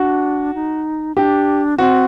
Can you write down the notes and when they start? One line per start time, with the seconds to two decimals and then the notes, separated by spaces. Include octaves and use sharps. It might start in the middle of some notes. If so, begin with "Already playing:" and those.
Already playing: D4 F#4
0.54 D#4
1.16 D4 G4
1.78 C4 F#4